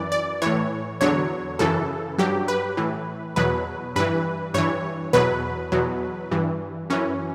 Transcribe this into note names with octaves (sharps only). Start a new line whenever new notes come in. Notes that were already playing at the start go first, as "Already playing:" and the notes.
Already playing: F#2 E3 D5
D5
A2 E3 C#5
E2 D3 F#3 C#5
F#2 C#3 E3 A4
G2 F#3 G4
B4
A2 E3
E2 B2 F#3 B4
G2 E3 B4
G2 E3 C#5
E2 B2 F#3 B4
E2 B2 F#3
G2 E3
F#2 E3 C#4